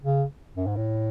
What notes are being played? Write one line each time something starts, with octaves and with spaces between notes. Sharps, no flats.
C#3
F#2
G#2
A2